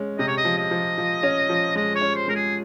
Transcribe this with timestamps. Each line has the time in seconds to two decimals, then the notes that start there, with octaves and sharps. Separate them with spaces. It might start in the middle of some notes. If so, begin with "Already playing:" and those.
Already playing: G#3 C#4
0.18 C3 D#5
0.27 C#5
0.37 D#5
0.45 F3
0.57 D#5
0.71 F3
0.98 F3
1.23 C#4
1.49 F3
1.75 G#3 D#5
1.95 C#5
2.02 C#4
2.15 C5
2.28 G#3 A#4
2.35 G#4